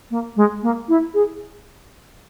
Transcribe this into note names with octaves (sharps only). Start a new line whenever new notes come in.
A#3
G#3
A#3
E4
G#4